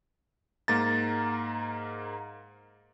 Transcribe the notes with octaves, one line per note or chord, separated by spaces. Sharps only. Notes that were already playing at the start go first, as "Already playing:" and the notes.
G#2 A#3 A#5 A6